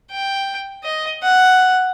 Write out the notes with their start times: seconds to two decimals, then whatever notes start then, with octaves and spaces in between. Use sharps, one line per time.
0.12 G5
0.83 D#5
1.23 F#5